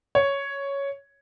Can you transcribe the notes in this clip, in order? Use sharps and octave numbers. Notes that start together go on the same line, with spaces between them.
C#5